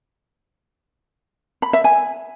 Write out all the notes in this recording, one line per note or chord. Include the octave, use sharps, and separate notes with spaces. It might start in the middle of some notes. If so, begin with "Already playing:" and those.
B5
E5
G#5